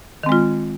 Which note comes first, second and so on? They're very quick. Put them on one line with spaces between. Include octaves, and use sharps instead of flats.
D#3 C4 G#3 F4